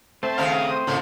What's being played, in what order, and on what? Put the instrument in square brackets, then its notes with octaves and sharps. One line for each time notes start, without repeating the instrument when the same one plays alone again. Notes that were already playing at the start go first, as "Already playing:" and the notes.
[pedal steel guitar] A3 C4 E5 [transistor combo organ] C5 A5
[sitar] D#2 C#3 A#4 [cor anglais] F5
[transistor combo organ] D#6
[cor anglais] C5
[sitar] F2 A3 A#3 [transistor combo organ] A2 C#3